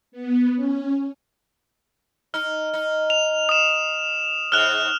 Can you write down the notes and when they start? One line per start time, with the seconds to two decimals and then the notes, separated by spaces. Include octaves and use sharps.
0.12 B3
0.56 C#4
2.34 D#4 F6
2.74 D#4
3.10 F7
3.49 D#6 E7
4.52 G#2 C#3 F6 F#6 F7